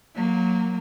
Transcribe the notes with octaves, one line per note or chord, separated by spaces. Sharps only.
F#3 A#3